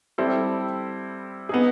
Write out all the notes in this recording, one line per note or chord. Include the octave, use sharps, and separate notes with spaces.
G3 C4 E4 A4
B3 D#4 G#4